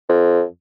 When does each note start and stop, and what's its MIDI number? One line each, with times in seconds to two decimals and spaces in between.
0.09 0.42 41